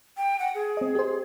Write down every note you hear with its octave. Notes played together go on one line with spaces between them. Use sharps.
G5
F#5
G#4
C4 D#5
G4 C5